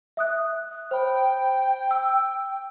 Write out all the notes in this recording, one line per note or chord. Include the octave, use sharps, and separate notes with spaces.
E5 D#6 F#6
C5 G5 B5
E6